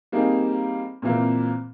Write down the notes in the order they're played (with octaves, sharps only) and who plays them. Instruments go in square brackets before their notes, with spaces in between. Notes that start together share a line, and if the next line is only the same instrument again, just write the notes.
[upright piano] G3 A#3 C4 D#4 G#4
A#2 E3 A#3 C4